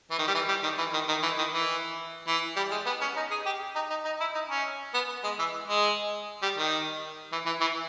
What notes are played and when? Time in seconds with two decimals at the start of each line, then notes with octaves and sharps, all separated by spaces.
0.10 E3
0.19 D#3
0.28 G3
0.35 E3
0.49 G3
0.63 D#3
0.78 E3
0.93 D#3
1.08 D#3
1.23 E3
1.38 D#3
1.53 E3
2.28 E3
2.56 G3
2.71 G#3
2.86 B3
3.01 C#4
3.16 D#4
3.31 G#4
3.46 G4
3.75 D#4
3.90 D#4
4.05 D#4
4.20 E4
4.35 D#4
4.50 C#4
4.94 B3
5.24 G#3
5.39 E3
5.68 G#3
6.42 G3
6.58 D#3
7.32 E3
7.46 E3
7.61 E3